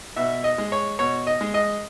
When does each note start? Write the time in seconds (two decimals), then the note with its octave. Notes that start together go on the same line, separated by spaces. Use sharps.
0.16 B2 E5
0.44 D#5
0.58 G#3
0.72 C#5
0.99 B2 C#5
1.27 D#5
1.41 G#3
1.54 D#5